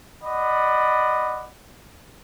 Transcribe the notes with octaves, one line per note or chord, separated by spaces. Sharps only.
D5 D#5 F#5 B5